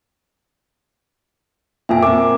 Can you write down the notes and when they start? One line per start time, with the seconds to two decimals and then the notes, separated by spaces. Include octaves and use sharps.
1.89 F2 A#2 E5 G#5
2.03 C4 A#4 D6